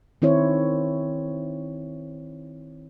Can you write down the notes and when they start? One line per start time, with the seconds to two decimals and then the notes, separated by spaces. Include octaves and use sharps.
0.22 D#3 C4 E4 C5 C#5